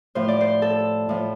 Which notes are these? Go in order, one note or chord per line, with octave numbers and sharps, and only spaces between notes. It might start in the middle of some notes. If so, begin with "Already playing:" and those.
A2 F3 C5
D5
C5
A4
A2 F3